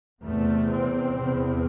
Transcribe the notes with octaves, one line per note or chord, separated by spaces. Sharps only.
E2 C3 A3
C4
E2 C3